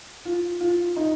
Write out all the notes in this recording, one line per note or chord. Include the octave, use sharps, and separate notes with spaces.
F4
F4
D#4